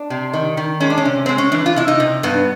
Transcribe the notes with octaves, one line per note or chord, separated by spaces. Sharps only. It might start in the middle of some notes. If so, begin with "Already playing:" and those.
Already playing: D4
C3
D#3
D#3
G#3 C#4
D4
C#4
C3
G#3 C4
C#4
E3 D4
F4
C3 E4
D#4
C3
G2 B3